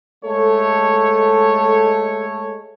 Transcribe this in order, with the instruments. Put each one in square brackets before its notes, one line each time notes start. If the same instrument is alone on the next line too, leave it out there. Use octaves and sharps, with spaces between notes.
[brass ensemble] G#3 A3 A4 C#5